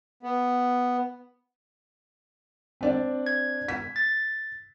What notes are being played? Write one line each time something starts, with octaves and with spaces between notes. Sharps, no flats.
B3
C4 D4 D5
G#6
B6
A6